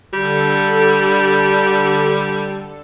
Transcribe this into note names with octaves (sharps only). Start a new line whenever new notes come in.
D3 G3 A4